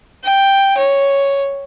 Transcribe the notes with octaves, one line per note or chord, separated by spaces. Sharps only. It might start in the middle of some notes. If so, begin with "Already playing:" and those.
G5
C#5